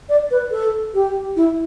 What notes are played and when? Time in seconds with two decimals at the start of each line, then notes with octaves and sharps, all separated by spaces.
0.09 D5
0.31 B4
0.51 A4
0.94 G4
1.36 E4